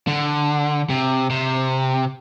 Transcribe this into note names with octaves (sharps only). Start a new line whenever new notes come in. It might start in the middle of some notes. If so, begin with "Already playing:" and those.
D3
C3
C3